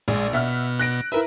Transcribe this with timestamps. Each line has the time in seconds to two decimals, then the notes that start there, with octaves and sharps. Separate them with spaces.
0.08 A#1 G#3
0.33 B2 E5 F#5 F6
0.79 F#6 A#6 D7
1.12 E4 A#4 B4 E5